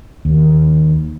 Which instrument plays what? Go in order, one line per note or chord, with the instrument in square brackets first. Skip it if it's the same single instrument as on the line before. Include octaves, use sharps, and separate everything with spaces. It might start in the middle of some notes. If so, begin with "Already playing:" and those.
[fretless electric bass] D#2